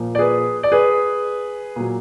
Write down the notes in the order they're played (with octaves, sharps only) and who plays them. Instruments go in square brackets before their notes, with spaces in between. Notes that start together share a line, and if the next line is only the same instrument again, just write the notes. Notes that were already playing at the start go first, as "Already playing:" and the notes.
Already playing: [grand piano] A#2 F3
D5
G#4 B4
D5
G#4 B4
A#2 F#3